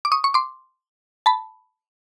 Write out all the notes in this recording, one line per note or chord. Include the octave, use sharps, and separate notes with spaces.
D6
C#6 D#6
C#6
C6 D6
A5 B5